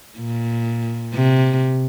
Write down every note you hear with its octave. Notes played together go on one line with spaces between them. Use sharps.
A#2
C3